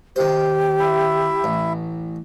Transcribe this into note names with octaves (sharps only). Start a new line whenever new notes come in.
D#3 G4 C5
E4 E5
A1